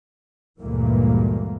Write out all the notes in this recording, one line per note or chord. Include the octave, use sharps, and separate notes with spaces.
D2 G2 A#2 E3 G#3 A#3